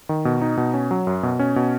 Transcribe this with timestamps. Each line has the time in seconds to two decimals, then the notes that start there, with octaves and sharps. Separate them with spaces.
0.09 D#3
0.25 B2
0.41 D#4
0.57 B2
0.74 C#4
0.91 F#3
1.07 F#2
1.23 B2
1.39 C#4
1.56 B2